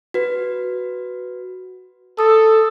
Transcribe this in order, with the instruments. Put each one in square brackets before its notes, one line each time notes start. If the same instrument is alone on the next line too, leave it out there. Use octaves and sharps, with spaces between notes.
[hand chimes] F#4 B4
[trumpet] A4 [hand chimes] D#6